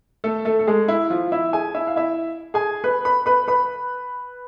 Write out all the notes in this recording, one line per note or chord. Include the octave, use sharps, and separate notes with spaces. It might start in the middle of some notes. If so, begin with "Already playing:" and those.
A3 A4
A3 A4
A4
G#3 G#4
E4
F3 F4
E4 E5
G#4 G#5
E4 E5
F5
E4 E5
G#4 G#5
B4 B5
B4 B5
B4 B5
B4 B5